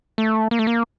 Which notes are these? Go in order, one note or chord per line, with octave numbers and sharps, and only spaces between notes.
A3
A#3
A3
A#3